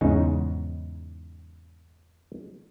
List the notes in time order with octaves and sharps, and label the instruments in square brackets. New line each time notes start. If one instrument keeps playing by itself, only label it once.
[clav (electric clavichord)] E2 G#2 C#3 D#4